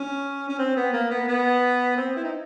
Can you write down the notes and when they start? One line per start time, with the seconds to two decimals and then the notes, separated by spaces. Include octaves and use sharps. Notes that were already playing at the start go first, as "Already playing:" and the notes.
Already playing: C#4
0.49 C#4
0.59 C4
0.76 B3
0.93 A#3
1.11 B3
1.28 B3
1.97 C4
2.16 E4
2.24 D#4